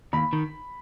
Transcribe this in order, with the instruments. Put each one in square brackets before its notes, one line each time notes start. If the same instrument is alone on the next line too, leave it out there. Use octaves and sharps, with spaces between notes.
[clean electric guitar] D#2 [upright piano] B5
[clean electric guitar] D#3